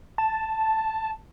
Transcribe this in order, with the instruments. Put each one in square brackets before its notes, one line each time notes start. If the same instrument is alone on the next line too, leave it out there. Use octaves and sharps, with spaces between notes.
[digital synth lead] A5